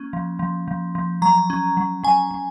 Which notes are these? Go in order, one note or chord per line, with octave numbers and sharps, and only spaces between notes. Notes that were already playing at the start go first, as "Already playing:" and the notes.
Already playing: A#3 C#4
F3
F3
F3
F3
F#3 A#5
C#4
F#3
F#3 G#5
F#3